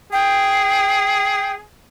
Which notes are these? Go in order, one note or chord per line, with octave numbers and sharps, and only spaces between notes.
G#4 G5